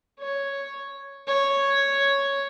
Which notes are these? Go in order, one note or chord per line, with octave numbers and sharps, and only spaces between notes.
C#5
C#5